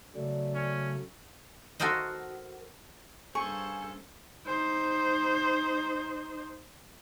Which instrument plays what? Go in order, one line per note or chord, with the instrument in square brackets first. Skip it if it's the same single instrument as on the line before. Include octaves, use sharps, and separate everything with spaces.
[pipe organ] C#3 F#3 A3 [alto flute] D5
[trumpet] C#4
[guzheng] F#4 A4 A#4 C5 D#5
[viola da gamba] G2 A4 C5 [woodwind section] A#3 C#4 [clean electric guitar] G#4 [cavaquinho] C#6
[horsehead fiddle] D#4 C5